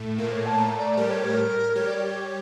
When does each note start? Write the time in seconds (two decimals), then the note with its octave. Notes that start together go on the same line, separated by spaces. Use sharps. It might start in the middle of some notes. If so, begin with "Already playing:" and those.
Already playing: A2 A3
0.18 A#2 A#3 A#4
0.32 C#5
0.45 A5
0.58 A2 A3 A#5
0.77 D5
0.97 G3 G4 A#4
1.10 C#5
1.23 A#4
1.75 G3 G4 C#5
1.86 D5
1.96 C#5